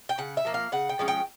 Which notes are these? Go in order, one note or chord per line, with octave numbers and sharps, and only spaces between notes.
G5
C#3 F#5
E5
F3 A#3
F5
C#3 F#5
G5
F3 G#3 C#4
G5